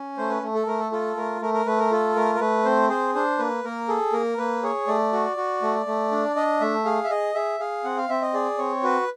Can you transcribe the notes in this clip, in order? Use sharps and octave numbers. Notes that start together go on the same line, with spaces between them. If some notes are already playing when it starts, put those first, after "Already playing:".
Already playing: C#4
A3 C5
B4
A3
A4
A3 A#4
A4
F4 A4
A3 A#4
A3 A#4
A#4
A3 B4
A#4
F4 A4
A3 A#4
A#4
A3 B4
C4 C5
G#4 C5
D4 C5
A#3 B4
A#3 A#4
G#4 A4
A#3 A#4
A#3 B4
G#4 C#5
A3 D5
F#4
F#4
A3
A3
D4
D4 D#5
A3 E5
G#4 F5
E5
G#4 D#5
G#4 E5
G#4 F5
C4 F#5
F5
C4 E5
D#5
G#4 D5
C4 C#5
F#4 B4